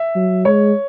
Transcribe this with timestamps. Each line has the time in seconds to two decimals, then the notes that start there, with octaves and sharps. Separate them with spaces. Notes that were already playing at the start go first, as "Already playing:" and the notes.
Already playing: E5
0.16 F#3
0.45 G#3 C#5